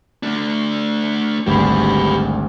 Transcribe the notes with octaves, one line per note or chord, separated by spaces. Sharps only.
A3 D4
G#1 D2 G3 G4 B4